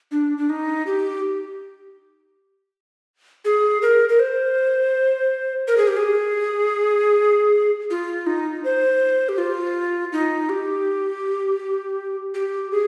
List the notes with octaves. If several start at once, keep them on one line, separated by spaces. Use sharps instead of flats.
D4
D4
D#4
G4
G#4
A#4
A#4
C5
A#4
G#4
G4
G#4
F4
D#4
C5
G4
F4
D#4
G4
G4
G#4